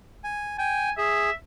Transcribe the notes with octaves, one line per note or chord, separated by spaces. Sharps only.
G#5
G5 G#5
G#4 E5